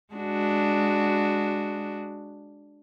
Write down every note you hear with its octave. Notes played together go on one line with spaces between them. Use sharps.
G#3 D4 F#4